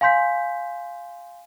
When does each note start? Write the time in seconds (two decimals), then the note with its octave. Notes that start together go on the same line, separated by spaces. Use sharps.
0.01 F5 G#5 C6 G6 B6